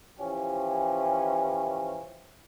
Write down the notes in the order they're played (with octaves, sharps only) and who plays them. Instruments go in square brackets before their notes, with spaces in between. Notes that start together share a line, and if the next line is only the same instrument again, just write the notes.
[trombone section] E3 F3 C#4 G4